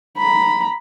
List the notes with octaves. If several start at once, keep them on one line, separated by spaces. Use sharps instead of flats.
A#5 B5